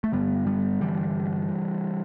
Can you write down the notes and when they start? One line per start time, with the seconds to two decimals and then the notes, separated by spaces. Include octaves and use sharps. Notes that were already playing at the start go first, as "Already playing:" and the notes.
0.04 A3
0.12 G2 D3 G3 B3
0.47 G3 B3
0.81 G2 D3 E3 G3